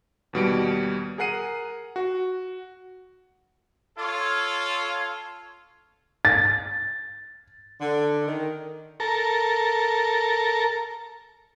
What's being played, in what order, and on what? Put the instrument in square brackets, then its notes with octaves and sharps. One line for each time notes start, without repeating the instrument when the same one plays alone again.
[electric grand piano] D#2 B2 G3 D7
G#4 A#4 F#5 C7 D#7
F#4
[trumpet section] F4 A4 C#5
[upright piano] A6
[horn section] D3
D#3
[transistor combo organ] A4 A#4